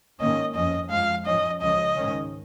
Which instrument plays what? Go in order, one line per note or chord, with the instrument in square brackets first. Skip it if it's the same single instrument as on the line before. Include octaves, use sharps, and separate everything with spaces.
[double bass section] G#2 D#3 A#3 C#4 [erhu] D#5
[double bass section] F2 F3 C#4 [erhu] D#5
[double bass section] F2 F3 G#3 [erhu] F5
[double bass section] G#2 F3 C#4 [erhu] D#5
[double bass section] C#2 C#3 F3 C#4 [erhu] D#5
[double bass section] G#2 D#3 C#4